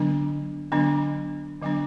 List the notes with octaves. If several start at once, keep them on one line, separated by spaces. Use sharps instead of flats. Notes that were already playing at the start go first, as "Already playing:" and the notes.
Already playing: D3 F#3 B3 D4
D3 F#3 B3 D4
D3 F#3 B3 D4